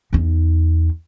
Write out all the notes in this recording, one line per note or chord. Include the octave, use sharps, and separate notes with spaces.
E2 D#4